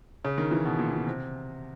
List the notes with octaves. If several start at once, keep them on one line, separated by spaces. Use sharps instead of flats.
C#3
D#3
E3
B2
A#2
A#2
C3